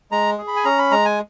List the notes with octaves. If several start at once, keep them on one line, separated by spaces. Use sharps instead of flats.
G#3 A#5
G#4
B5
G#5
C#4 A#5
B5
G#3 A#5
G#5